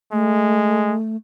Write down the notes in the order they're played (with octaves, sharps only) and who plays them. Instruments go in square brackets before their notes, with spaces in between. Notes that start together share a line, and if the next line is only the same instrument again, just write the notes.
[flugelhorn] G#3 [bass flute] A3